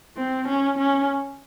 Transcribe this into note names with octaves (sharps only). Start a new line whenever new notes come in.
C4
C#4
C#4